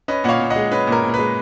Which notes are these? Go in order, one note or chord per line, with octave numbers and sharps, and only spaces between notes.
C#4 B4 D#5
A#2 C#5 F5 F#5
A#2
D#5 F#5
G#3
C#4 B4
A#2
A#4
A#2
A#4
G#3 B4